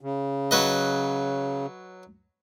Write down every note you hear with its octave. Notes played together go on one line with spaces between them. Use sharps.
C#3
F#3 B4 D#5